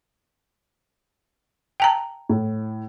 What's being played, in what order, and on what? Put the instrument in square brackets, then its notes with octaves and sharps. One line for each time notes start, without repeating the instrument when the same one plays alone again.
[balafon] G5 A5 A#5
[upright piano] A2